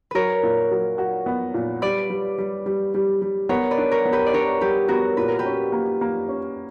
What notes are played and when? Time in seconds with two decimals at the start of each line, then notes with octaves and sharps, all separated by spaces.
0.11 F#3 A#4 B4 C#5
0.43 A#2
0.71 F#3
0.98 F#4
1.26 B3
1.54 A#2
1.82 G3 B4 D5
2.10 G3
2.38 G3
2.66 G3
2.94 G3
3.22 G3
3.49 B3 A#4 C#5
3.71 B4 D5
3.78 D4
3.91 A#4 C#5
4.05 B3
4.12 G4 B4
4.26 D5
4.33 D4 A#4 C#5
4.61 G3 G4 B4
4.88 B3 F#4 A#4
5.17 A#2 B4
5.28 A#4
5.39 G4 B4
5.45 C#4
5.72 A#3
6.01 A#3
6.28 C#4